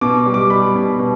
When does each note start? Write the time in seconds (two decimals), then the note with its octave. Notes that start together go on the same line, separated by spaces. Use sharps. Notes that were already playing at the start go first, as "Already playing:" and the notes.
0.01 B2 D6
0.26 G3
0.34 D6
0.50 G3 B5
0.75 B2
0.99 B2